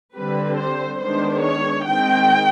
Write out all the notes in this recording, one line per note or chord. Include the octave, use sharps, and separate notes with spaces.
D3 G3 C4 B4
C5
D#3 G#3 B3 D4 C5
C#5
D#3 G#3 C4 G5